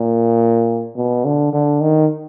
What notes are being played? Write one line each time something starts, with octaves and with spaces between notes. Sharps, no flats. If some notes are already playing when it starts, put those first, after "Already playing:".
Already playing: A#2
B2
D3
D3
D#3